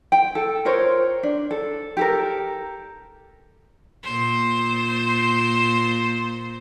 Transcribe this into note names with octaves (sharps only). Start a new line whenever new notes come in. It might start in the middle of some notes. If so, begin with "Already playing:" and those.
G5
A4
F4 A#4 C5 C#5
D4
A4
G4 A4 A#4
A#2 C5